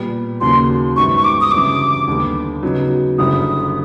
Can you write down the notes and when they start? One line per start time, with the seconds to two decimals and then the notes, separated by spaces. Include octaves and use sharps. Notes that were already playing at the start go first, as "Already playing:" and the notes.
Already playing: A#2 G3 B3
0.41 D#2 C#3 F#3 A#3 C6
0.96 G#1 F#2 D#3 G3 B3 C#6
1.17 C#6
1.24 D6
1.41 D#6
1.51 G1 F#2 C#3 E3 G3 D6
2.08 D#2 D3 G3 B3
2.62 C#3 F#3 B3 D#4
3.18 F#1 F#2 D3 G3 D#6